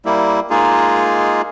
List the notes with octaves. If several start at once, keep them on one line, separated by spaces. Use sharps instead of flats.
G3 A#3 E4
G#3 A#3 D#4 F4 G#4